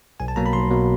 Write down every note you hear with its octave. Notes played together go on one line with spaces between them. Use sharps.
B1 G#5
A5
B2 F#3 A#3 A#5
B5
B1 C6
B2 F#3 A#3